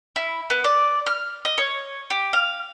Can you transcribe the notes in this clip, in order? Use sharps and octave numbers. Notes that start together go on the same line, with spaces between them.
E4
B3
D5
F6
D#5
C#5
G4
F5